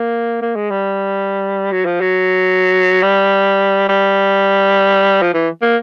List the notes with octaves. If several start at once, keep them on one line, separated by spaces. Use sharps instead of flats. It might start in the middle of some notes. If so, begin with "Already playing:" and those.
Already playing: A#3
A#3
G#3
G3
F#3
F3
F#3
G3
G3
F3
E3
A#3